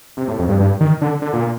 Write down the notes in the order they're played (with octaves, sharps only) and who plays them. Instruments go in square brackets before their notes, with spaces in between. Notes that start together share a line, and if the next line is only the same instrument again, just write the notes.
[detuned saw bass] C3
A2
F2
G2
G2
D#3
D3
D3
A#2